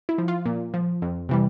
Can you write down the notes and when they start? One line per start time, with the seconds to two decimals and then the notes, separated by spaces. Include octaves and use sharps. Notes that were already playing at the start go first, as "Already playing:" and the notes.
0.09 E4
0.18 F3
0.28 F4
0.45 A#2
0.74 F3
1.02 F2
1.29 C3 E3 G3